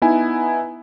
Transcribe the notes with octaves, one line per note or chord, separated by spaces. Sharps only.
B3 D#4 E4 G#5